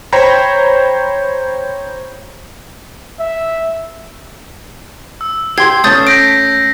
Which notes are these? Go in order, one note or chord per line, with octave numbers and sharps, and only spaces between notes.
C5 C#5 G5 A#5 B5
E5
E6
G4 G5 C6 G#6 C7
A3 C#4 A5 D#6 G6 A6
G6 A#6 B6 D7